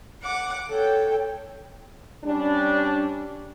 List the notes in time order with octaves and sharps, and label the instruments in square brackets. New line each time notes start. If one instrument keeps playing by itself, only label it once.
[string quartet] F#5 D6
A4 C#5 G5
[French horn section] G3 C#4 D4